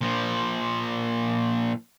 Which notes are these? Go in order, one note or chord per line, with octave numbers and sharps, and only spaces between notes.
A#2 F3